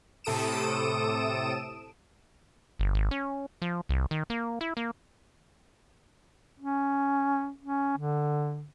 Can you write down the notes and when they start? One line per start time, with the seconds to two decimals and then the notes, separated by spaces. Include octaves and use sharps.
0.24 A2 C3 A4 D#6 D7 E7
2.79 G1
2.95 G#1
3.11 C#4
3.62 F3
3.89 C2
4.11 D#3
4.30 A#3
4.61 E4
4.77 A#3
6.60 C#4
7.61 C#4
7.97 D3